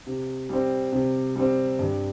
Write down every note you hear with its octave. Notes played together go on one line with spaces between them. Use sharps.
C3
G3 C4
C3
G3 C4
G2